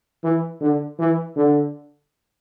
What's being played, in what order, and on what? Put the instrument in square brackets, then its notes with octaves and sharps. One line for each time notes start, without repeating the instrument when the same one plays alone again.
[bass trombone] E3
D3
E3
D3